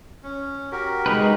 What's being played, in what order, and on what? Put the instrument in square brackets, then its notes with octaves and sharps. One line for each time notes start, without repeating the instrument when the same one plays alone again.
[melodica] C#4
F#4 G4 A#4
[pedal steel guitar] G#3 D#4 B4